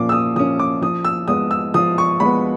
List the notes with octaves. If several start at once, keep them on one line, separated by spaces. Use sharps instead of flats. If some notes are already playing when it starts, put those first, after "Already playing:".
Already playing: A#2 F3 A#3 C#4 D6
E6
D#6
F3 A#3 C#4 D#6
D6
F3 D#6
E6
G#3 B3 D#6
E6
F3 D#6
C#6
G#3 B3 B5